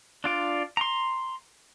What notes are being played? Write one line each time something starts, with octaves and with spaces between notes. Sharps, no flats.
D4 F4 D5
A#5 C6